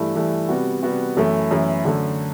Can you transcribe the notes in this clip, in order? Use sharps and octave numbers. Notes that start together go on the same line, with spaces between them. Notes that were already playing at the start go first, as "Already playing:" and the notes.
Already playing: G2 E3 A3 E4
G2 E3 A3 E4
C3 G3 B3 F#4
C3 G3 B3 F#4
F#2 E3 A3 E4
F#2 E3 A3 E4
F#2 D3 A3